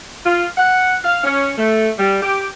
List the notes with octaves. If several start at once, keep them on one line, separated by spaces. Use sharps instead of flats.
F4
F#5
F5
C#4
A3
G3
G4